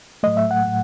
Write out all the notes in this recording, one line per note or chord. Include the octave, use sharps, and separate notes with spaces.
A2 F#3 A3 D#5
E5
F#5
A2 F#3 A3